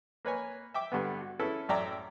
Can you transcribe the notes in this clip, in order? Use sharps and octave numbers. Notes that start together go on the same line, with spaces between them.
A#3 B4 C#5 G#5
E5 G5 D6
G2 D3 B3
F#4
C#4 E4 G#4 A4 B4
A1 F#2 D5 E5 G5 A#5